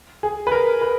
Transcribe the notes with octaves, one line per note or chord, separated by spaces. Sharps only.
G#4
B4
A#4
B4